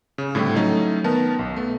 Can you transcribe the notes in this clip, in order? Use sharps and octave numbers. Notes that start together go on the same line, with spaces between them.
C#3
A2 D3 G3 A3 C4
F#3 A3 C#4 D#4
D#3 B3 A#4 A5
B1
A3 B3